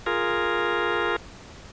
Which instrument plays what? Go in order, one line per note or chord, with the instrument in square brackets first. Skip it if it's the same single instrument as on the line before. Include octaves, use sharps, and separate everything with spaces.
[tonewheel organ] F4 G#4 A#4